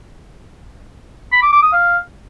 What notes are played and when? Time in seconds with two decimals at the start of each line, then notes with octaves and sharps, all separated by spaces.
1.32 B5
1.42 D6
1.52 D6
1.63 D#6
1.73 F5